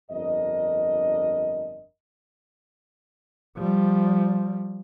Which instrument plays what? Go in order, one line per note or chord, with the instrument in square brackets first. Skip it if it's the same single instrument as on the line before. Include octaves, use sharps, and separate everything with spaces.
[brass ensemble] G1 F2 D4 A#4 D#5
[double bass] F3 G3